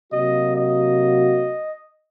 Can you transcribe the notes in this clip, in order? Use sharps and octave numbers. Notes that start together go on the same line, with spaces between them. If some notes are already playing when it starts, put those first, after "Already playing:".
C3 F#3 A#3 F#4 D#5
D#5